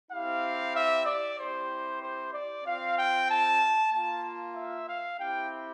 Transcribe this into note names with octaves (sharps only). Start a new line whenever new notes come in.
C4 E4 G4 F5
E5
D5
C4 E4 G4 C5
C5
D5
C4 F4 F5
G5
A5
A#3 F4 A5
E5
F5
C4 E4 G4 G5